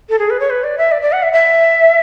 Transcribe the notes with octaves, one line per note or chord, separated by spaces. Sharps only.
A4
G#4
B4
C#5
B4
D5
E5
D5
D5
F#5
E5
E5